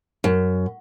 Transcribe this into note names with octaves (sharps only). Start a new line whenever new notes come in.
F#2